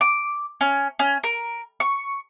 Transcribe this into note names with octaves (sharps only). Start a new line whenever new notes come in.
D6
C#4
C#4
A#4
C#6